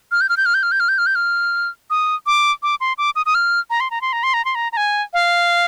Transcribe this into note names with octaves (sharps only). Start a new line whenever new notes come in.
F6
G6
F6
G6
F6
G6
F6
G6
F6
G6
F6
G6
F6
D#6
D6
D6
C6
D6
D#6
D#6
F6
A#5
C6
A#5
C6
A#5
C6
A#5
C6
A#5
A#5
G#5
F5